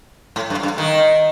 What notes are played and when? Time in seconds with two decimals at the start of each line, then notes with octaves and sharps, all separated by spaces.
0.36 A2
0.50 G2
0.63 G2
0.78 D#3